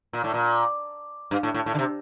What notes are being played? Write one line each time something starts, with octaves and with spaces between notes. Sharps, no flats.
A#2
A2
A#2
G2
A2
A2
A2
D3
C3